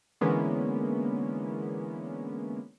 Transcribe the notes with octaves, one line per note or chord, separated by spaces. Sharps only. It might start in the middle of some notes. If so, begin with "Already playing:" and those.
D3 E3 G#3 A#3 B3 C#4